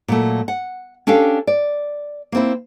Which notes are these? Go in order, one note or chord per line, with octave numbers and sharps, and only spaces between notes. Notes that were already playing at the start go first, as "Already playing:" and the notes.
A#2 F#3 A3
F#5
C#4 D4 G4 A4 F5
D5
A#3 C4 E4